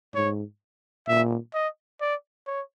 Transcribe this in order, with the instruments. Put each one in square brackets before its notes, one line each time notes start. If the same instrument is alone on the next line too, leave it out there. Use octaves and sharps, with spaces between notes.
[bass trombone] G#2 [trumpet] C#5
[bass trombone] A#2 [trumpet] E5
[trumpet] D#5
D5
C#5